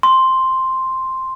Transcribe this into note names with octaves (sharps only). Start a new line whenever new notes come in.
C6